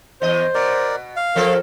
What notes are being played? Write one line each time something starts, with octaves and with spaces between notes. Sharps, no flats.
E2 C5 D#5
B2 A#4 D5
F5
F3 C4 A4 A#4